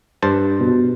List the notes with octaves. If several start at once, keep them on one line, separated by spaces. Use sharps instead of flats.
G2 C5 A5
B2